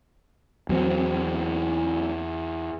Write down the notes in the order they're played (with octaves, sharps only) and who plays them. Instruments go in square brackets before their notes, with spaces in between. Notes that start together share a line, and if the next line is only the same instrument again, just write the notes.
[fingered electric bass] E2 F#3 G#3 C4